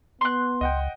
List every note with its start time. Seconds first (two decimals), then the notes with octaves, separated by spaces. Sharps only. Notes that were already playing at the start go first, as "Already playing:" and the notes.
0.21 B3 C6 F#6
0.61 C#2 D#5 F#5 G5